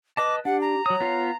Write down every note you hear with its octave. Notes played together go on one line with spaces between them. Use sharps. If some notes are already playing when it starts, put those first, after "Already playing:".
B4 D#5 A5 D6
D4 G4 F#5
A#5
F#3 C#5 D#6
B3 F4 F5